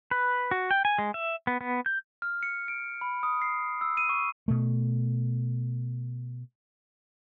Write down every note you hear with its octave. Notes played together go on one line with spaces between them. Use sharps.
B4
F#4
G5
G#5
G#3
E5
B3
B3
G6
F6
C#7
D7
B5
D#6
C7
E6
D#7
C#6
B2 A3